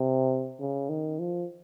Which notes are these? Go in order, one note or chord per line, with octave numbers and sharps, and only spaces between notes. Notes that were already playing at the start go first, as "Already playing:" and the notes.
Already playing: C3
C#3
D#3
F3